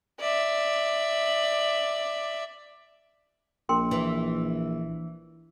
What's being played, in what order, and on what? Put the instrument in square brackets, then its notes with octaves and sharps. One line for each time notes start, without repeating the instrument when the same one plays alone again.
[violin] D5 E5
[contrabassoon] A#1 [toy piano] A#4 G5 C6
[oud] E3